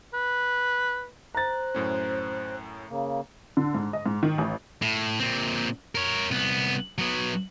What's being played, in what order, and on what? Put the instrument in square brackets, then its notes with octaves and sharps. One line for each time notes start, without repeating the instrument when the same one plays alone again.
[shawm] B4
[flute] C5 [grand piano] A#5 A6 [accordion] F#6
[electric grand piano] F#2 A2 C#4
[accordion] C#3 A#3
[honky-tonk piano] D3
G#2
D#5
G#2
D#3
A1
[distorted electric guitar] A2
A#2 C4
A#4 C#5
C2 B3
F#3 B3